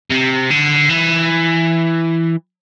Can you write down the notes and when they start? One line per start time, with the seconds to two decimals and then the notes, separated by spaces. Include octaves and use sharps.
0.10 C3
0.50 D3
0.89 E3